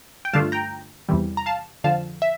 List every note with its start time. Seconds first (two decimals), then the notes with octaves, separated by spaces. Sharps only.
0.25 G5
0.33 G2 D3 A3 D4 F4 F5 A5
0.52 G5 A#5
1.09 E2 C3 E3 G3
1.37 A#5
1.46 F5 A5
1.84 F2 D3 F3 F5 A5
2.22 E5